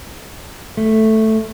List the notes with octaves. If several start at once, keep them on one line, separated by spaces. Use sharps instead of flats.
A3